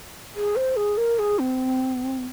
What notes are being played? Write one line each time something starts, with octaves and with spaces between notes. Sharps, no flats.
G#4
C5
G#4
A#4
G#4
C4